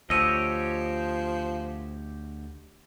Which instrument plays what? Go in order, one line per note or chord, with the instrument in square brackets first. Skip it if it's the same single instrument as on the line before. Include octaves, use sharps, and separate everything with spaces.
[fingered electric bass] D2 [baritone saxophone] F3 [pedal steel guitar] G4 C#5 D#5 [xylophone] E6 D#7